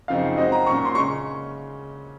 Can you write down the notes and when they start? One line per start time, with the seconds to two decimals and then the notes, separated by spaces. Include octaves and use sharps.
0.08 F#2 C#3 F3 C4 D#4 F5
0.37 G#3 C4 F#4 C5 D#5
0.52 A#5
0.66 A#2 F#3 C#4 C#6
0.85 C6
0.95 C#3 G#3 C#4 C#6